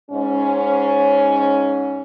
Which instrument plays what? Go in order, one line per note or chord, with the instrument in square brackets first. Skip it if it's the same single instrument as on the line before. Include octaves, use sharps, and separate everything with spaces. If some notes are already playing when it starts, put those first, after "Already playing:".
[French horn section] G#2 C#4